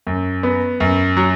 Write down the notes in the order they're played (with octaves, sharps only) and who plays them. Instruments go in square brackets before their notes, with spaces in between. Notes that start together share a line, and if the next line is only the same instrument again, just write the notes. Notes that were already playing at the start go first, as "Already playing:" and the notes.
[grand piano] F#2
B3
F#2
F#3